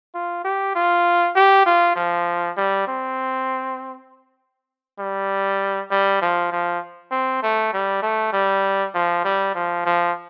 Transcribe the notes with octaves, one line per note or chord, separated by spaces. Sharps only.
F4
G4
F4
G4
F4
F3
G3
C4
G3
G3
F3
F3
C4
A3
G3
A3
G3
F3
G3
F3
F3